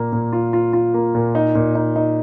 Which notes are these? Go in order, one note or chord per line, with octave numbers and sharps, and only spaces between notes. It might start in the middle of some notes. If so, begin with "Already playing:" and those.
Already playing: A#2 A#3
A#2
F4
F4
F4
A#3
A#2
D#4
A#2
D#4
D#4